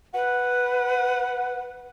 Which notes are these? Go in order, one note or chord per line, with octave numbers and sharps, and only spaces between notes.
B4 F#5